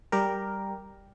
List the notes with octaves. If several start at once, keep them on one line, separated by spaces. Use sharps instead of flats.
G3 G4 A#4